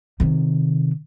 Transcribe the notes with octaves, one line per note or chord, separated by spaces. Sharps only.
C3 D#3